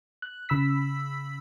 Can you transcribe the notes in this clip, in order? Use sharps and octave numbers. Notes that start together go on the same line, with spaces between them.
F#6
C#3 B5 E6 B6